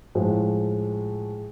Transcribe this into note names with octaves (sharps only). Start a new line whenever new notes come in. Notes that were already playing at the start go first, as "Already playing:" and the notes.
A2 F3 G#3